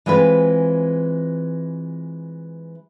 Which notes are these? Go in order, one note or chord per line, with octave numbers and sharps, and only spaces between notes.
E3 G#3 C4 F4 B4